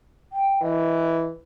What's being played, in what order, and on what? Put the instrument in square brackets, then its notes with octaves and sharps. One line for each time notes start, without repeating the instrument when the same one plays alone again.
[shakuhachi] G5
[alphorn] E3 [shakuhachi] D#5